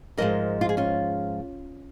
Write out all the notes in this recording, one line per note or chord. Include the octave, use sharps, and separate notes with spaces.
G#2 F3 G#3 A#4 D#5
F4
G#4
C#4 F4